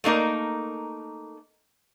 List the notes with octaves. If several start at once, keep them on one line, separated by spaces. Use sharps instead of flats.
A3 A#3 D#4 A#4